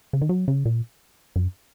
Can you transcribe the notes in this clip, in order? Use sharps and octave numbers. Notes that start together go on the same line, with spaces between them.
C#3
D#3
F#3
C#3
A#2
F#2